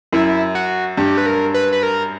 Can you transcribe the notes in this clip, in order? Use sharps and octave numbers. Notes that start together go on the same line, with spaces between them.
F#2 E4
F#4
G2 G4
B4
A#4
B4
B4
A#4